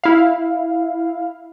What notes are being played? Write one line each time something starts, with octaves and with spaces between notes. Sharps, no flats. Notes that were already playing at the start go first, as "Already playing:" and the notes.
E4 F5